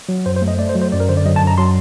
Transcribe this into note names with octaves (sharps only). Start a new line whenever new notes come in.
F#3
F#2 C5
C5
A3
D#5
A3 D5
C5
F#3
C5
F#2 D5
A#4
D3 C5
D5
F#3 D#5
A5
F#2
A#5
F#3 C6